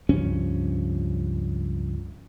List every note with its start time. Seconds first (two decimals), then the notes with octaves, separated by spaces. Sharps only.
0.09 C#2 G2 F3 C#4